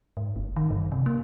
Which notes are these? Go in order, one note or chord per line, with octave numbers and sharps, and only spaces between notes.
G#2
G1
D#3
G2
C3
A#3